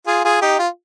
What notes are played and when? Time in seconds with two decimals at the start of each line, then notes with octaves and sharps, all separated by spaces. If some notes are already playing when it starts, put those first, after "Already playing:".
0.07 F4 G#4
0.25 F4 G#4
0.41 D#4 G4
0.59 F4